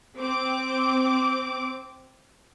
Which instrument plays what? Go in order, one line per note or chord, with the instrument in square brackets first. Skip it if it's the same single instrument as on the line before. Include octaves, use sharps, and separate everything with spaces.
[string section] C4 D6